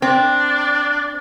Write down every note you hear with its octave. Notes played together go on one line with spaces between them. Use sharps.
C4 D4